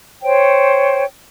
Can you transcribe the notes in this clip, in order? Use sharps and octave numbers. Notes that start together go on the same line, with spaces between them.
C5 C#5 G5